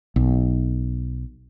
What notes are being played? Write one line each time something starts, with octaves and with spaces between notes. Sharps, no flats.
B1